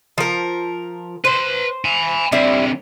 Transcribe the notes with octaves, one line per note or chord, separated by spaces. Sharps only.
F3 A#4
B4 C5 C6
G#5 B5
D3 G3 C4 E4